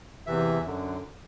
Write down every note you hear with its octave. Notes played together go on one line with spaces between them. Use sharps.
E2 C3 E3 E5
F#2 D3